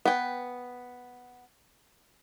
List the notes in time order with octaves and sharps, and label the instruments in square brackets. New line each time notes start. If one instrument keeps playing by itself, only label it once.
[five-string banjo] B3 G5